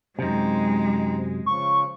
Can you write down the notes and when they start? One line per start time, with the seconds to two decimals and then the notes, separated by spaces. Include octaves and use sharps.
0.19 F#2 C3 G#3 C4 D#4 C5
1.46 C#3 F3 C#6